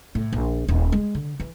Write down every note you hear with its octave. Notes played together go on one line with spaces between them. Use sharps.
A2
A#1
D#1
G#3
D3
E3